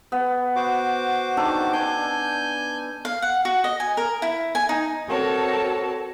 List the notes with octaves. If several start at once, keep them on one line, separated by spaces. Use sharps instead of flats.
B3
F#4 C5 D6
D#3 D4 A4
D4 G#5 G6
F5
F#5
F#4
D#5
G#5
A#4
E4
G#5
D#4
C4 F#4 A4 A#4 C#5 A5